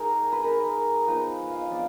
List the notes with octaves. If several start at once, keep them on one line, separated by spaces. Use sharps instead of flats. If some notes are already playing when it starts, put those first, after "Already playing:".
Already playing: G#3 D#4 G#4 A#4
B4
G#3 D#4 A#4
F3 G#3 B3 D#4 B4
F5
D#5
F3 B3 D4 F4 D5